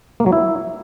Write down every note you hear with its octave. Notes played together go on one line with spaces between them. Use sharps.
A#3
F#3
E4